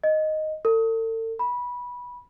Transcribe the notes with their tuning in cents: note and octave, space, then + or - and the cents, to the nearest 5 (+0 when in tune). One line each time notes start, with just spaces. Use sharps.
D#5 +0
A4 +40
B5 -15